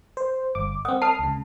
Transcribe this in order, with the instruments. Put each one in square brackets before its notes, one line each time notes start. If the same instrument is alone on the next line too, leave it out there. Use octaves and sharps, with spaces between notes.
[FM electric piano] C5
G1 D6
[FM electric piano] C4 F#5 [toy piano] D#6
[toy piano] A5 [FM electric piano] D#6 F6 C7
[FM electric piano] C#2 C#3